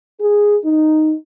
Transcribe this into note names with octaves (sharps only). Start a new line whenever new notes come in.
G#4
D#4